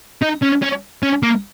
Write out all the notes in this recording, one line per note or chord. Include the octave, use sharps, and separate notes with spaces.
D#4
C#4
C#4
C#4
A#3